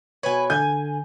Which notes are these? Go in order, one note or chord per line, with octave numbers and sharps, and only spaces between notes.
B2 B4 C#5 G#5
D3 G#5 G6